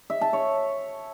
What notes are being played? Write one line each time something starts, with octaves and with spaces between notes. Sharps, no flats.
E5
A5
C#5